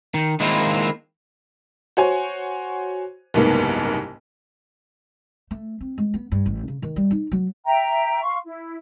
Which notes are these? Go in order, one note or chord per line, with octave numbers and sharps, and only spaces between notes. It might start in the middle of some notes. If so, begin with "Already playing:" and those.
D#3
D#3 G#3 A#3 C4 E4 F4
F#4 C5 C#5 G#5
F#1 C2 G#2 A#3 B3
A3
C4
G#3
B3
G2
A1
C#3
D#3
G3
D#4
F#3
E5 G5 A#5
F5 C6 C#6
E4